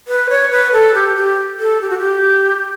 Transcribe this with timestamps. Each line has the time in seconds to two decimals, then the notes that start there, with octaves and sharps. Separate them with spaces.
0.08 B4
0.30 C#5
0.51 B4
0.72 A4
0.94 G4
1.16 G4
1.60 A4
1.81 G4
1.90 F#4
1.99 G4